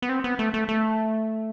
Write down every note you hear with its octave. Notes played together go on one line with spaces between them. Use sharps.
B3
C4
B3
A3
A3
A3